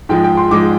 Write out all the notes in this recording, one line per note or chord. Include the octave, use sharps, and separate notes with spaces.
G#2 F3 G#3 G5
G5
C6
G#2 F3 G#3 D6